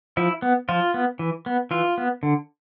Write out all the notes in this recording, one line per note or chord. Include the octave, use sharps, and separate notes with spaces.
F3 E4
B3
F3 F4
B3
E3
B3
E3 F4
B3
D3